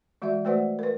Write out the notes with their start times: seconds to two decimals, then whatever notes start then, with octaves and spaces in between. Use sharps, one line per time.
0.22 E3 G#3 F#4 D5 E5
0.45 A3 F#4 B4 C5 D5 F#5
0.79 A#4 B4